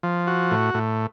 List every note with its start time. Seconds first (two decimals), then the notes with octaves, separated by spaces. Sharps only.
0.03 F3
0.27 F#4
0.51 A2
0.74 A2